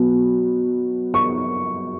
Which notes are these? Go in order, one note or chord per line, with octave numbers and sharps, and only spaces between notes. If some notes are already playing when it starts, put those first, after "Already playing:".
Already playing: B2 F#3 B3
C#6